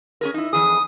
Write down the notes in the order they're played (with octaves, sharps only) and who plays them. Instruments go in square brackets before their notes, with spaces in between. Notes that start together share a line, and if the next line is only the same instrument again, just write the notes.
[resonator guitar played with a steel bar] C#4 G#4 A#4
D#4 E4
[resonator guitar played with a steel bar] F2 E3 G#4 [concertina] D#6